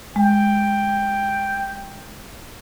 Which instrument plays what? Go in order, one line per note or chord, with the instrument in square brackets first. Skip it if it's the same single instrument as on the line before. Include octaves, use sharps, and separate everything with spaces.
[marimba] G#3 [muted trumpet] G5